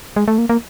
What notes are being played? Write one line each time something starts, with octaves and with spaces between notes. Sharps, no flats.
G#3
A3
A#3
A#3